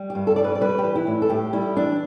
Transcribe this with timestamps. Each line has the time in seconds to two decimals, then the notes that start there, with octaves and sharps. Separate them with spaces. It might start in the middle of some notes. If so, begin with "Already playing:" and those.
Already playing: G3
0.10 G4
0.15 G2
0.27 A4
0.36 G3 D5
0.44 B4
0.55 D5
0.61 G3 B4
0.78 G4
0.84 E3
0.95 E4
1.07 A2
1.22 A4
1.30 A2 G4
1.53 G3 E4
1.76 E3 D4